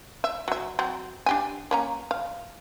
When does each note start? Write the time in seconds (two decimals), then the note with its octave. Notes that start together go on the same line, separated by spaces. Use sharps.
0.24 E5
0.48 F#3 E5
0.79 F#3 C4
1.26 D4 G4 G#5
1.71 A#3 C#4 A#5
2.11 F5